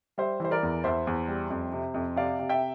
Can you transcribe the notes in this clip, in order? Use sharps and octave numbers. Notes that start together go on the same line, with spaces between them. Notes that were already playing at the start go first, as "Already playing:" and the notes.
G3 C5 E5
E3 C5
A#4 D5
E2
E2 C5 E5
E2
G3
F2
C3
F2
C3 D5 F5
C3
E5 G5